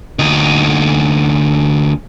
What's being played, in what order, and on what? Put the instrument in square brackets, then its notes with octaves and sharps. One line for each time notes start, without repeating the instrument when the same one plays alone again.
[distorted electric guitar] D2 D#4